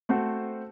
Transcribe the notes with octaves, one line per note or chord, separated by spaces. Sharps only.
A3 C4 F#4 C5